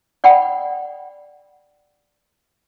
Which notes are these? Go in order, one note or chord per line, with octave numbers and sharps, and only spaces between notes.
D5 F#5 G5 B5